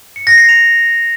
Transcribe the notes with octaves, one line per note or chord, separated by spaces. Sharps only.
C#7
A#6
C7
F7